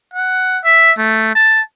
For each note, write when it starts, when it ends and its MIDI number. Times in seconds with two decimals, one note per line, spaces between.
0.14 0.59 78
0.65 0.92 76
0.98 1.34 57
1.35 1.61 81